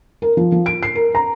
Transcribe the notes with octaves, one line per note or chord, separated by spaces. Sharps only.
A#4
F3
F3
D7
C7
A#4
A#5